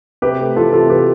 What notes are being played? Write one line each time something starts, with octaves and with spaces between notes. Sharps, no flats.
C3 G4 B4
A3
E3 F4 A4
C3 F4 A4
C3 G4 B4